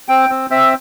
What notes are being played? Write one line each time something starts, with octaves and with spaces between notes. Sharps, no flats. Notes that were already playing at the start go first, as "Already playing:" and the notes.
C4 G5
C4
C4 E5